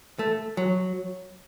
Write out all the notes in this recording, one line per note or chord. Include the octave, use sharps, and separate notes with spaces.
A3
F#3